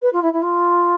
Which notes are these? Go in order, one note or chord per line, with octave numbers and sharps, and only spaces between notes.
B4
F4
E4
E4
F4